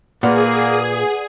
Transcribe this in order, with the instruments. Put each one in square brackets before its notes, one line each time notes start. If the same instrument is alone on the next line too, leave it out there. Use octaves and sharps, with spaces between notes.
[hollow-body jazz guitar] A#2 [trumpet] A#3 [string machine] G#4 [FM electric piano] B4 D5 F#5